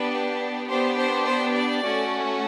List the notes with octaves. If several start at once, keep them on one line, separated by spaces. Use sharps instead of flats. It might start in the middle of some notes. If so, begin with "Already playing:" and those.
Already playing: B3 D4 G4 B4
B3 D4 G4 C5
C5
C5
D5
A3 C#4 F#4 A4